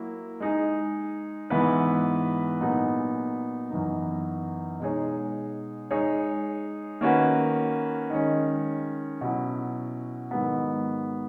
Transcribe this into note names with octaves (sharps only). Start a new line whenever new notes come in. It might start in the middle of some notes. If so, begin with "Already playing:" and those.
Already playing: F#3 A#3 E4
G#3 D#4 G#4
G#2 E3 B3 E4 B4
A#2 F#3 B3 D#4 G#4
F#2 E3 B3 D#4
B2 G#3 D#4 G#4 C#5
G#3 D#4 G#4 C#5
D#3 A#3 C#4 F#4 B4
D#3 G#3 C#4
B2 F#3 C#4 E4
G#2 D#3 F#3 B3